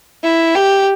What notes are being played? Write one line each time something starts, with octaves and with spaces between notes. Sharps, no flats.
E4
G4